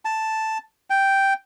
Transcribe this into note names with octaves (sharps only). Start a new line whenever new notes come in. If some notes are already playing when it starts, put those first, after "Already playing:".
A5
G5